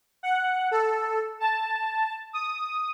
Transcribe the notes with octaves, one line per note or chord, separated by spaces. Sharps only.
F#5
A4
A5
D#6